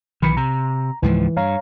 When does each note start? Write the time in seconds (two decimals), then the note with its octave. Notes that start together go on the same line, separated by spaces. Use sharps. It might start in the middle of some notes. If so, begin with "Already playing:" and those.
0.22 B1 D#3 E3 B5 C#7
0.37 C3 A#5
1.02 C#2 G#2 E3 F3
1.37 G2 C#5 F5 A#5